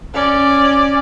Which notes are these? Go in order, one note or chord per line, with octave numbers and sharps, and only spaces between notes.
C#4 D5